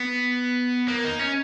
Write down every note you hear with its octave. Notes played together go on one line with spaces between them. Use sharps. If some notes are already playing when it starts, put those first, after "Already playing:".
Already playing: B3
A#3
D#4
C#4